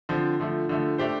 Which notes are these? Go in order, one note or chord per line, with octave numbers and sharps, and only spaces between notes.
D3 F3 C4
D3 F3 A3
D3 F3 A3
A3 D4 G4 C5